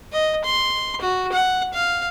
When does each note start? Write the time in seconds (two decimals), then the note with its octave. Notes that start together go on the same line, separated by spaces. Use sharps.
0.12 D#5
0.45 C6
1.01 F#4
1.32 F#5
1.73 F5